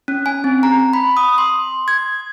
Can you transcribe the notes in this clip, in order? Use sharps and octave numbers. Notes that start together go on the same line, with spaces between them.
C#4
G#5
C4
A#5
B5
D#6
C6
G#6